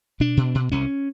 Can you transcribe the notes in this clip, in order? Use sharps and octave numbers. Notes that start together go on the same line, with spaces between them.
B2 D4
B2
B2
C2 C#4